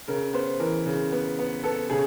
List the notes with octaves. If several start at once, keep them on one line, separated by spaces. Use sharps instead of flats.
C#3 A#4
B3 C5
E3 A#4
C#3
B3
B3
B3 A4
C#3 G#4